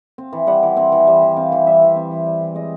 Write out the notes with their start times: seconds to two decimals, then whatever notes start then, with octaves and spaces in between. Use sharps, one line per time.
0.18 C4
0.33 E3
0.47 G3 F#5
0.63 E3
0.77 C4
0.92 E3
1.07 G3
1.22 E3
1.37 C4 F5
1.52 E3
1.67 G3 E5
1.82 E3
1.96 C4
2.11 E3
2.26 G3
2.41 E3
2.55 G#3 D#5